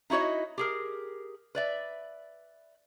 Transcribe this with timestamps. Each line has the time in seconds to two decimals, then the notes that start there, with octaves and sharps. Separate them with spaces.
0.10 D#4 E4 F#4 C#5 D#5
0.58 G4 G#4 A#4
1.55 B4 D5 E5